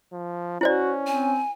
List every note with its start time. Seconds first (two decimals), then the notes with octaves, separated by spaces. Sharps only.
0.13 F3
0.61 C#4 E4 F#4 C5 D5
1.07 C4 G#5